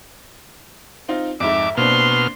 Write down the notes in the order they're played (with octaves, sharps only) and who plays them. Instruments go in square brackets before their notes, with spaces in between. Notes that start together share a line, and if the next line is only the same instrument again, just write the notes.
[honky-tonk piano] C4 D#4 F4
[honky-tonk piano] F2 G#2 [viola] E5 [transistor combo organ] D6
[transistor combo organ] B2 F6 [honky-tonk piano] A#3 C4 D4 [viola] C6